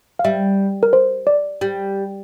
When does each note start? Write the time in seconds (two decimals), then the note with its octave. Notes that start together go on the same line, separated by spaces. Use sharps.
0.19 F5
0.24 G3 E5
0.83 A#4
0.93 C5
1.27 D5
1.61 G3